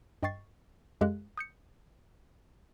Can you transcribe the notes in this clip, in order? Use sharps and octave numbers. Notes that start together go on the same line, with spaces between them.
G2 D#5 G5 C#6 A6 C7
F#2 G#3 G4 A4 F5 F#6
D#6 G6 C#7